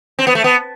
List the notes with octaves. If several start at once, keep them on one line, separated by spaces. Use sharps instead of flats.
C4
B3
A3
B3